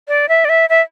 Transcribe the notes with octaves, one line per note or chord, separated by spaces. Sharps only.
D5
E5
D5
E5
E5